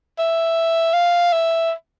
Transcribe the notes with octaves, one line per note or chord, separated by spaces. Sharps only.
E5
F5
E5